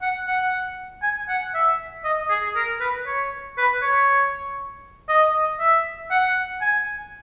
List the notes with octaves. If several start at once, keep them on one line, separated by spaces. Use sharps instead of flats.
F#5
F#5
G#5
F#5
E5
D#5
G#4
A#4
B4
C#5
B4
C#5
D#5
E5
F#5
G#5